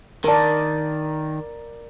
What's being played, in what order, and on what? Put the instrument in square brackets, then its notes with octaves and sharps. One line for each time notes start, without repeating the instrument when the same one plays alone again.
[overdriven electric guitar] D#3 [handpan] A#4 D5 [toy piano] A5 A#5